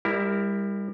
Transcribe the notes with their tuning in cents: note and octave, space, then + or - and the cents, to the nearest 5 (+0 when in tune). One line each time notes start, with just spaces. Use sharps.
G3 +30 E4 +0 A#4 +0